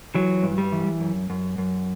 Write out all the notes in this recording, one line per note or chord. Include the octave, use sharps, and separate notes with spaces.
E3 F#3
G2
G3
E3
F#2
F#2
F#2